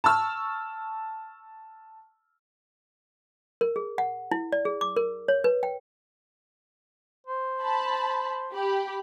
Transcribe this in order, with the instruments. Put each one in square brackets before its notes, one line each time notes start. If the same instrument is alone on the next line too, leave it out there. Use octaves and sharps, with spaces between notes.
[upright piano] A5 C#6 E6 F6
[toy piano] A#4
G#4
F#5
E4
D5
G#4
D6
A#4
C#5
B4
G5
[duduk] C5
[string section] A5 B5
G4 B5